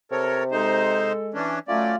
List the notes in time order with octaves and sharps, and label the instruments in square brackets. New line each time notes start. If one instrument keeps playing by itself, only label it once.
[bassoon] C3 [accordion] A4 A#4 C#5
[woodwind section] G#3 A4 [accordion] D#4 C5
[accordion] E3 C#4 D4
[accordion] F#3 C#4 D5 [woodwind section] A3 [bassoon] F4